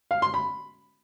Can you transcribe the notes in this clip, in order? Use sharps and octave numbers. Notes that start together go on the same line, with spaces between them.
F5
C6
B5